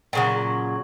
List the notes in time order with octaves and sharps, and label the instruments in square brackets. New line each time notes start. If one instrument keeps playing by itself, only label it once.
[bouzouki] A#2 C#3 F#3